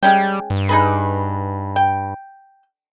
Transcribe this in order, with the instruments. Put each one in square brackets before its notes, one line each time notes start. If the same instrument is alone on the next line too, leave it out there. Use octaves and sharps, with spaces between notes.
[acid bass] G3 [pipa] G#3 C#4 G5
[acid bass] G2
[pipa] D#4 G#4 B4
G5